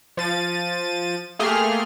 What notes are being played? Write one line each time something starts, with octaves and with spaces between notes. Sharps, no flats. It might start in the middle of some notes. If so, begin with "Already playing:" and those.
F3 A6 D#7
A3 A#3 G4 G#4 C6 F6